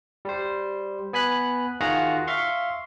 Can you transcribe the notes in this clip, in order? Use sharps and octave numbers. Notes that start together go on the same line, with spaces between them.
G3 C5
B3 G#5 B5 F#6
D#3 F4 F#4 G#4 F#5 A#5
E5 F5 C6 C#6